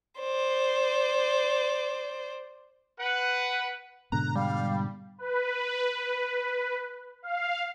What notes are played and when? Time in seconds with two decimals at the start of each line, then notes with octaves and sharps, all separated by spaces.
0.20 C5 D5
2.98 B4 F#5
4.12 G#2 B2 D3 A#5 F#6
4.36 G3 F5
5.18 B4
7.22 F5